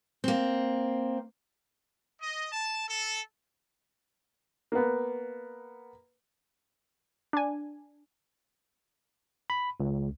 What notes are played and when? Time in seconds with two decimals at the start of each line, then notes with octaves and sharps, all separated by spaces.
0.24 A#3 C4
2.20 D#5
2.52 A5
2.87 A4
4.72 A#3 B3
7.33 D4 G#5
9.50 B5
9.80 C#2